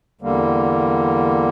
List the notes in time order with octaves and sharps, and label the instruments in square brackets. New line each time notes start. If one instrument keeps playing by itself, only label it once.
[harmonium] E2 D3 G3 A#3